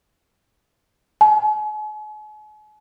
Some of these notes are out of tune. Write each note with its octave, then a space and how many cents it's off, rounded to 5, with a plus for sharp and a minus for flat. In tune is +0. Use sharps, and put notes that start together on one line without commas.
G#5 +45